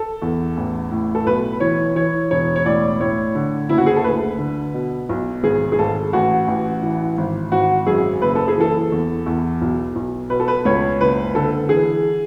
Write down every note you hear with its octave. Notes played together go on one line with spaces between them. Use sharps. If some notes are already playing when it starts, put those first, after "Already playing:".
Already playing: A4
E2
A1
A2
A4
B1 B4
E3 C#5
E3 C#5
E1 C#5
C#5
A2 D5
A2 C#5
D3
F#1 E4
F#4
G#4
A4
D2 B4
D3
B2
B1
G#1 G#4
G#4
G#1 A4
A1 F#4
A1
E3
G#1
G#1 F#4
F#2 G#4
F#1 B4
A4
G#4
E3 A4
E2
E2
B1
B1
B2 B4
A4
B4
C#2 C#5
F#1 B4
D3 A4
E3 G#4